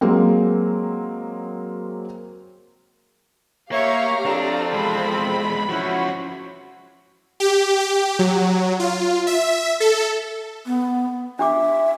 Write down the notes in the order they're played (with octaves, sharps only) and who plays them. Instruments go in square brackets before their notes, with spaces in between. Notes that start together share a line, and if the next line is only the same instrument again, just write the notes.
[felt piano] F#3 G#3 A#3 C4
[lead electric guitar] A#3 [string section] G4 F5 A#5 [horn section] C#5 [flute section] E5 C#6
[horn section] F3 C4 [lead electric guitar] D4 [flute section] A4
[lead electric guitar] E2 G#3 [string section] B5
[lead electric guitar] F3 C#4 [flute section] E4 C5 [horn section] F#4
[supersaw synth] G4
G4
F#3
F4
E5
A4
[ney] B3
[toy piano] D4 G4 D6 [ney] E5